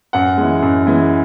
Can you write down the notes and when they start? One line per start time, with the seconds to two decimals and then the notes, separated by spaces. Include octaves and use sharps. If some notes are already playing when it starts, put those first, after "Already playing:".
0.13 F#2 F#5
0.38 E3 G#3
0.62 F#2
0.87 E3 G#3